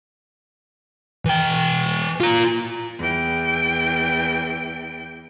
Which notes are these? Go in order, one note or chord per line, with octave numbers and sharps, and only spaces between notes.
E3 G5
F4 A#5
E2 G5